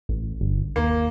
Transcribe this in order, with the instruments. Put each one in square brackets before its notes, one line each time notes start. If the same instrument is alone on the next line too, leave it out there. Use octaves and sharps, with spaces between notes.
[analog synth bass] A1
G1
[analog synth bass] D#2 [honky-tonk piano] A#3